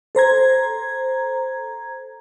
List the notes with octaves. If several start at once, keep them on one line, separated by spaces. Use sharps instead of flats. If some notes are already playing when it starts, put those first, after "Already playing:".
A4 C5 A#5 G#6